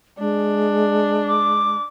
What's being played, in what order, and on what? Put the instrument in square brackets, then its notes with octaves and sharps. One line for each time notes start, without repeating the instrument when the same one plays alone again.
[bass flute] G#3 [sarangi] D4
[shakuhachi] D6